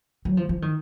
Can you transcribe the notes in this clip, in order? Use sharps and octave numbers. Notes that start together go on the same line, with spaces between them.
F#3
F3
F3
D#3